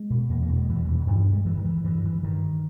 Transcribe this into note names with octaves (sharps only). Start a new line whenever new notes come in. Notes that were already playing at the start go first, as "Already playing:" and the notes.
Already playing: G#3
B2
E2 A#3
A#3
B2
G#3
E2 E3
G3
B2 E3
D#3
G2 E3
G3
G#3
G2 E3
D#3
E3
G2 E3
E3
G2 D#3